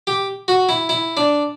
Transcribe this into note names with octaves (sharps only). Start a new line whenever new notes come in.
G4
F#4
E4
E4
D4